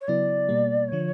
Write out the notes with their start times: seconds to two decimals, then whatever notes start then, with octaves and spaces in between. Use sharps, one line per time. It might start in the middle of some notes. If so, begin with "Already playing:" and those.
0.01 C#5
0.08 C#3 F#3 B3 E4 D5
0.49 B2 G3 A#3
0.88 D3 F3 C#5